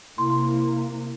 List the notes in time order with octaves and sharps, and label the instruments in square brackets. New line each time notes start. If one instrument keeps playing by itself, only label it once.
[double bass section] C3 A#3 [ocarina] E4 [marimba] C6